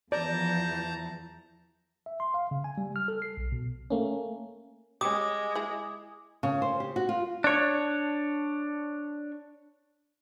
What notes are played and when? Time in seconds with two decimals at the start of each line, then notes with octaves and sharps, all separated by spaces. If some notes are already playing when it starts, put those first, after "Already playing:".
0.12 E2 E3 F3 D5 A5 A#5 G6
2.06 E5
2.20 C6
2.34 F5
2.51 C#3
2.64 G#5
2.78 G3
2.96 F6
3.08 A4
3.22 C7
3.37 B1
3.52 B2
3.90 A3 A#3 C#4
5.01 G3 G#3 C#4 D6 D#6
5.55 E4 G#4
6.43 C#3
6.62 C5
6.80 G4
6.96 F#4
7.09 F4
7.44 D4 C#5